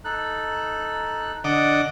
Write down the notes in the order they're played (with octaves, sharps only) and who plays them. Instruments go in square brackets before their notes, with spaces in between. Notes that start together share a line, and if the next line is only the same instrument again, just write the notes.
[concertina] D#4 A4 F#6
[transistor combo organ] D3 D#5 D6 [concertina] D5 F#5